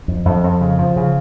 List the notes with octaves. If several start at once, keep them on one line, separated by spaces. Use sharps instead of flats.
F2
F2
F2
C#3
F3
C#3